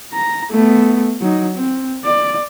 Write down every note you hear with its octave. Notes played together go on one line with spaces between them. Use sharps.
A#5
A3 B3
F#3 D#4
C4
D5